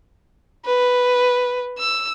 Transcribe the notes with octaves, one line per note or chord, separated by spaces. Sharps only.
B4
E6